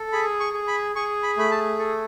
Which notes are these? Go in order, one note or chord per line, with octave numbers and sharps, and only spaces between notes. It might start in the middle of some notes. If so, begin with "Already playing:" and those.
Already playing: A4
G#4 B5
C#6
G#4
B5
G#4 C#6
B5
A3 B5
A5
A4